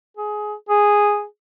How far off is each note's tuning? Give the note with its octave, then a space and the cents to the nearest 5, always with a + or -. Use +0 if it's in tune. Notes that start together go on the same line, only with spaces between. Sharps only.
G#4 +15
G#4 -5